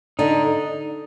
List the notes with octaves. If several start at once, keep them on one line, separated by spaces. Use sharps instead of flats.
D3 D#4